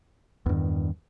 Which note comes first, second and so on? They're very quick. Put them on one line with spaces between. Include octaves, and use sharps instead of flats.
E2 G2 D#3